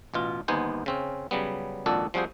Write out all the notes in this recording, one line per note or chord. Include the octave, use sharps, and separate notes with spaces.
A1 B2 F4
G1 D#2 B3 D#4 C5 G#5
C#3 C4 C#4
C#3 F#3 G3 B3
G#1 F2 A#2 D4 F#4 A4
F3 G3 C4 F#4 G#4 C5